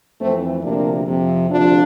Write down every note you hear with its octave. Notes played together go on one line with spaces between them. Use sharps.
F2 E3 A3 C4
D2 C3 F3 A#3 D4
F2 C3 F3
D2 C3 F3 D4 F4